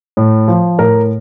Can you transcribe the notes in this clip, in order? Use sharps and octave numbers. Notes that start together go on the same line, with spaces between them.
A2
F3
A2 A#4